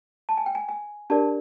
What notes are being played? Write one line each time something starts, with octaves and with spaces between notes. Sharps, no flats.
A5
G#5
G5
G#5
G#5
D4 G4 A#4 D5 A5